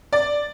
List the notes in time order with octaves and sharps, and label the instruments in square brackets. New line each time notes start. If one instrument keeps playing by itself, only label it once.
[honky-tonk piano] D5